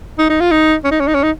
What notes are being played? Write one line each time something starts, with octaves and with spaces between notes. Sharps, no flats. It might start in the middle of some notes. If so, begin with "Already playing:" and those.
D#4
D#4
F4
D#4
C#4
D#4
C#4
D#4
C#4
D#4